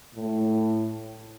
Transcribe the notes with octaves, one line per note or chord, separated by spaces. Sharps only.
A2